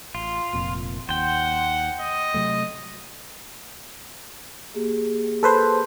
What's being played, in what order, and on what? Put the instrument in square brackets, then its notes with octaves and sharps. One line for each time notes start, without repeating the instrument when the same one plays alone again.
[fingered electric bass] A1 [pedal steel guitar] F4
[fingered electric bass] F1 F2 A#2
[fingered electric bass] D#2 [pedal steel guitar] C5 G5 [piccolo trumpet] F#5
[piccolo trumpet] D#5
[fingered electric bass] C3 F#3 A3
[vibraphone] A#3 G4 G#4
[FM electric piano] A4 B4 C5